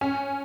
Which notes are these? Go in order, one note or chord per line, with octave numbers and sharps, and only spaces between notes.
C#4